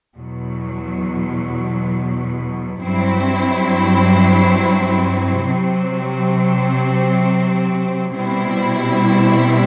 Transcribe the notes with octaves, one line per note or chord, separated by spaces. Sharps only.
E2 B2 F#3
G2 F#3 C4 E4
C3 F#3 C4
B2 G3 C4 E4